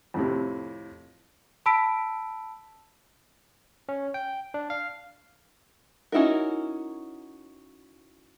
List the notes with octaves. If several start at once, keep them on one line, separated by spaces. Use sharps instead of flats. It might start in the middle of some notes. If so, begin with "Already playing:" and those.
F2 A2 C3
A5 B5 E6 B6 D7
C#4
G5
D4
F5
C#4 D#4 E4 F#4 A#4